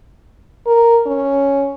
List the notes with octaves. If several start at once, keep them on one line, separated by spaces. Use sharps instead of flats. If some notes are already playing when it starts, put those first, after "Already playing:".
A#4
C#4